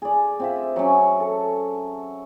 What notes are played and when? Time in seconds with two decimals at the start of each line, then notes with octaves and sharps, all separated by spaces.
0.02 G#4 D5
0.40 C4 F4 E5
0.76 F#3 C#4
1.20 A4